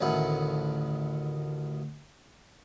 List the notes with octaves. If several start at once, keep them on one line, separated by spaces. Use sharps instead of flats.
A1 D2 D#3 E4 F#5